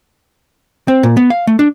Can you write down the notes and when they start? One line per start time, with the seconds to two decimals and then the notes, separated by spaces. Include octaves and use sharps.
0.88 C4
1.03 A#2
1.17 B3
1.30 F5
1.47 A3
1.59 D4